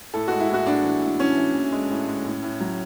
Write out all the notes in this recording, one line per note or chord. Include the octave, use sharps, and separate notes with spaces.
A2 A4
G#3 F#4
E4
A2
F#4
A2 D4
E3
A2
E3 C#4
E3
E3
G#3
A2
G#3
A2
A2
F#3